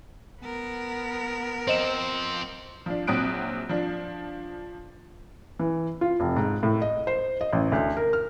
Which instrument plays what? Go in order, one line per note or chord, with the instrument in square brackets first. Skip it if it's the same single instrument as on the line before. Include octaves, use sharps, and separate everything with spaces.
[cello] B3 A#4
[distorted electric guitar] F3 C4 [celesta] C5 D#5 E7
[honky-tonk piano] F3 D4
A#1 F#3 C4 D#6 F#6 D7
F3 D4
[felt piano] E3
F4
F1
G#2
A2
D#5
C5
D#5
A1
D2
A#4
F6